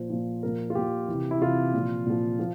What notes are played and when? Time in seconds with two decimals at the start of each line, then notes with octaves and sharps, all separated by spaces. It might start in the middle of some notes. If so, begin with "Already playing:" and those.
Already playing: A#2 F3 C5
0.10 A#2 F3
0.43 A#2 F3 A#4
0.70 F4
0.75 A#2 F3 G4
1.08 C3 E3
1.31 E4
1.41 C3 E3 F4
1.74 A#2 F3
2.06 A#2 F3
2.39 F3